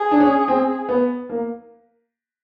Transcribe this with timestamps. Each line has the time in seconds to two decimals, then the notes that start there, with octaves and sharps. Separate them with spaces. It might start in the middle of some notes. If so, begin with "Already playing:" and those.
Already playing: G#4
0.11 D4
0.20 C#4
0.48 C4
0.89 B3
1.29 A#3